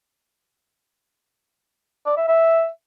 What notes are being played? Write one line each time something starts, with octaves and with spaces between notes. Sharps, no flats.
D5
E5
E5